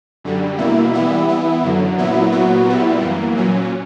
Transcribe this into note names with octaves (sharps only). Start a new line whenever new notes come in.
F#2 D3 G3
E2 B2 A#3 E4
E3 G3 B3 E4
E3 B3 E4
F#2 D3 F#3
A#2 F#3 B3 E4
A#2 F#3 B3 F#4
A#2 G3 B3 E4
F#2 E3 A#3
A#2 F#3 C#4